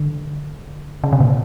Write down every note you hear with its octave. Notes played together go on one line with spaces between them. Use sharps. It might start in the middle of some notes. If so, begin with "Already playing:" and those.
Already playing: D3
C#3
C3
A#2